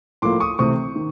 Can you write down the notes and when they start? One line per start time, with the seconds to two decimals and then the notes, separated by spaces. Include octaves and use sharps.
0.22 A2 F3 A#3 C6 D6
0.40 C#6 D#6
0.59 C3 E3 A3 C4 C#6 D#6
0.96 D#3